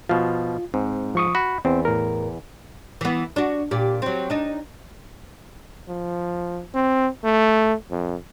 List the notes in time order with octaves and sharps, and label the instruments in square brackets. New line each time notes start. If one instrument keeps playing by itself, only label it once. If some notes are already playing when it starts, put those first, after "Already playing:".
[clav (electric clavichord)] B2 F3 [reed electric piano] F4
[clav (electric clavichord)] G#2 [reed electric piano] C4
[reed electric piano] F3 C#6 D#6
[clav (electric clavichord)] F#4 [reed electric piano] B5
[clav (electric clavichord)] E2 [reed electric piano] C4
[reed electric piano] A2 A#4
[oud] E3 B3
D4 F#4
A#2 G4
F#3 C4
D4 D#4
[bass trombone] F3
C4
A3
F2